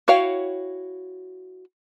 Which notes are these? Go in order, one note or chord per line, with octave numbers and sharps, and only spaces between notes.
E4 F#4 C#5 F5 G5